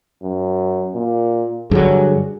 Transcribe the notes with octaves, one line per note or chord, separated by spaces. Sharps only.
F#2
A#2
G2 D3 F#3 G#4